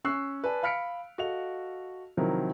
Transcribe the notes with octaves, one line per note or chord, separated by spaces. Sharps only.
C#4 C#6 E6 F#6 C7
B4 D5 G#5 A5
F5 B5 F6 B6 C#7 D7
F#4 A4 D#5 F5 F7
C3 D#3 F3 F#3 E4 A#4